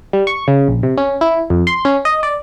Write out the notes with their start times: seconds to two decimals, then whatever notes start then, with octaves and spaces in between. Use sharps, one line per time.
0.13 G3
0.27 C#6
0.48 C#3
0.68 A#1
0.83 C3
0.97 C#4
1.21 E4
1.50 F2
1.67 C6
1.85 C#4
2.05 D#5
2.23 D5